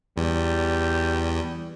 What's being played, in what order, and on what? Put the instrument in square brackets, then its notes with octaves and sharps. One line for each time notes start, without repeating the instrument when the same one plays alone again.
[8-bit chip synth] E2 [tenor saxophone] G3